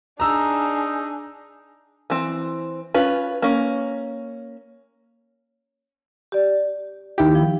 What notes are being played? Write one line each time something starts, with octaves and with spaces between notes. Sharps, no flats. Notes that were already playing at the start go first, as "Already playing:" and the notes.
D4 D#4 G#4 A#5 E6
E3 C4
C#4 F4 B4
A#3 C#4
G4 D5
D#2 E4 G4
F3